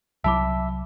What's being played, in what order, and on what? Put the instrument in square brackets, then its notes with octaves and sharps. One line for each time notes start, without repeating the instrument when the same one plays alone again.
[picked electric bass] C2 F#3 [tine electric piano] E5 [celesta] A5 B5 D6